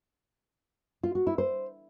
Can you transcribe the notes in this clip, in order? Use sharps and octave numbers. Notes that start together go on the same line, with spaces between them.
F4
F#4
E4
C5